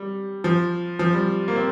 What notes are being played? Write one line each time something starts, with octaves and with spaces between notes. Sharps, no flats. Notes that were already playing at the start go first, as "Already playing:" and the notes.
Already playing: G3
F3
F3
G3
A#3
C4